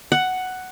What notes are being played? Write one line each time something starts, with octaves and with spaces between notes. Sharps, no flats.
F#5